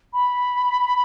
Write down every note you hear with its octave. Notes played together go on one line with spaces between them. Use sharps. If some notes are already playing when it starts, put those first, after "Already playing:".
B5